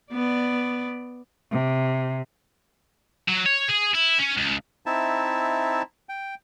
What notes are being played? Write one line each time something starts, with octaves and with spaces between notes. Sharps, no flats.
B3 D5
C3
F#3
C#5
G#4
E4
C#4
C#2
C4 D#4 E4 E5 A5
G5